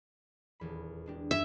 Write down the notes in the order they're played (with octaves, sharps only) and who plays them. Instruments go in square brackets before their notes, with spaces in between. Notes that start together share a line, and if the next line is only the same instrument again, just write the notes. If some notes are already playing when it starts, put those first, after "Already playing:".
[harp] D#1 E2 B5
G#3 D4 G4
[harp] F#2 D#4 G#5 [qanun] E5